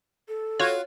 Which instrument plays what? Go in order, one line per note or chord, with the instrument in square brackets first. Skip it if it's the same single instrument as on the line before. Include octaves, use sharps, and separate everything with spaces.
[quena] A4
[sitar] F4 F#4 [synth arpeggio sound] C#5